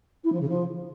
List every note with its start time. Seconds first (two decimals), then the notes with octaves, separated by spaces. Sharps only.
0.24 E4
0.33 F3
0.41 C#3
0.49 F3